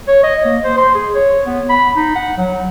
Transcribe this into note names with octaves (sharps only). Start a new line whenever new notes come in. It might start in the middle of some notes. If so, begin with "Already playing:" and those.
C#5
D#5
A#3
C5
C6
G#4
C#5
B3
B5
D#4
F#5
F#3